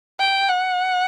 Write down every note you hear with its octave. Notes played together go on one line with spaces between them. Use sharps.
G5
F#5